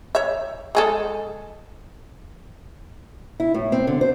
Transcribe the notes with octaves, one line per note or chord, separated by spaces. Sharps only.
C#5 E5
G#3 G#4 A4
E4
A2
C4
D3
C5